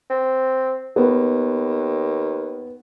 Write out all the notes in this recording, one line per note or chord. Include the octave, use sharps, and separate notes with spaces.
C4
D#2 B3